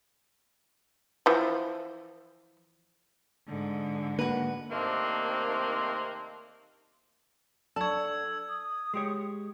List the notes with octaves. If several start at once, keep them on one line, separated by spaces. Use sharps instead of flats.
E3 F3
G#2 D3
A#3 F#4 B4
C3 D#3 A3 A#3 C4 D4
F#3 D4 A4 D5 A5 C#6 E6 G#6
D#6
G#3 G4 C#5